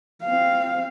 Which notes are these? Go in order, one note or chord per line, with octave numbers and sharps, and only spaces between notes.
C4 F5